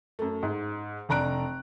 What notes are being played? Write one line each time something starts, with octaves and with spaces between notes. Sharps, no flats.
F#2 A3
G#2
F1 D4 A#5 F#6 D7